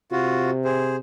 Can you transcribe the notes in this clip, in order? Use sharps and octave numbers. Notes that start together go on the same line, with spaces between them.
C3 F4 F#4
G#4 C5